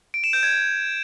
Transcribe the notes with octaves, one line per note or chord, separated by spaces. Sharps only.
D7
E7
G6
G#6